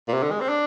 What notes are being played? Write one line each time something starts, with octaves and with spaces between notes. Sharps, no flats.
A#2
C3
D3
G#3
C4
D4